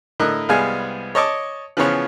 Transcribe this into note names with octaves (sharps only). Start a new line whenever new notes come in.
A2 D3 A#4 D#5 F#6
C2 G3 G#3 B3 F5 G#5
C#5 D#5 A5 C#6 D6
C#3 E3 F3 B3 F4 C#5